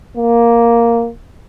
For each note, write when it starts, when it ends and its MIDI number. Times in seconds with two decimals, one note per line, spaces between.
0.17 1.09 58